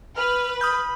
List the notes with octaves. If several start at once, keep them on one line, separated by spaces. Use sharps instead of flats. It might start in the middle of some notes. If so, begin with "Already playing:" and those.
B4 F6
B5 D#6 F6 G6